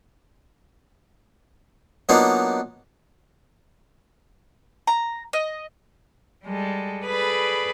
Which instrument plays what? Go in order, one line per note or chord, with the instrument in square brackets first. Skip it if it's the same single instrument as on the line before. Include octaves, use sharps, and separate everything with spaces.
[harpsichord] F#3 A#3 B3 D4 D#4 F4
[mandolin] A#5
D#5
[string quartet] G3 G#3 A4
G#4 A4 B4 D5 B5